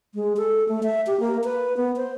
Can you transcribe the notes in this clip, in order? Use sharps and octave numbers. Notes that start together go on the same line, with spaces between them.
G#3
A4
A3
E5
G4
A#3
B4
B3
C5